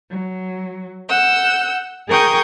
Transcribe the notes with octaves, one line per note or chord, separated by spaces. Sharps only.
F#3
F#5 E6 G6
G#4 A#4 G5 C#6 D#6 G6